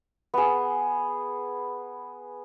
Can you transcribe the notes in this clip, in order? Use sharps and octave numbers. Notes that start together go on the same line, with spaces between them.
B3 G#4